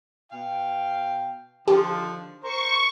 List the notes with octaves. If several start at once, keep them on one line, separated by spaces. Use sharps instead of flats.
B2 F5 G5
D3 D#3 F3 G4
A#4 C5 C#6